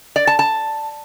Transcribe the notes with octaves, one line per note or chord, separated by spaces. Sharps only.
D5
A5
A5